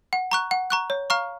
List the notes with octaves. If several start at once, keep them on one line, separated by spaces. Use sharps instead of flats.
F#5
A#5 C#6 F#6
F#5
A#5 C#6 F#6
C#5
F5 A#5 C#6 F6